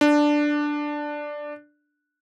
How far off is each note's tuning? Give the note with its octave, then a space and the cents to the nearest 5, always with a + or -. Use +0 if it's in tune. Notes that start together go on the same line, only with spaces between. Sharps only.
D4 +5